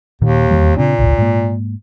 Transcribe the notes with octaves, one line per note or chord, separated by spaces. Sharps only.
D#2 A#2 D#3
E2 D#3 G3
A#2 C#3 C4 D4
D1 G#1 C#2
G#2 A#3